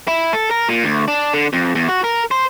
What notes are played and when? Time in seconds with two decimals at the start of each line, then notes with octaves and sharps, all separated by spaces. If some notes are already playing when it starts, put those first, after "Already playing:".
0.08 E4
0.33 A4
0.51 A#4
0.69 A#2
0.84 D2
1.08 D4
1.33 D3
1.53 F2
1.75 E2
1.88 F#4
2.04 A#4
2.31 C5